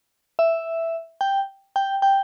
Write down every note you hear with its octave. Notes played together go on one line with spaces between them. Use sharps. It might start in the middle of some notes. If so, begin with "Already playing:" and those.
E5
G5
G5
G5